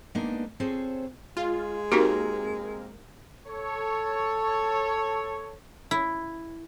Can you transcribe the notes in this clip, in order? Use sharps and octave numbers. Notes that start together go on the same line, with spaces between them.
G#3 A#3 B3 D4 D#4
C4 F4 G#4 A4 C5 C#5
G#3 F4
A#3 C4 D#4 F#4 G4 A#4
A4 C#5
E4